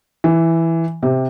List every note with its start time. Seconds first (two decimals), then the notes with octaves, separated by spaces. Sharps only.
0.24 E3
1.03 C3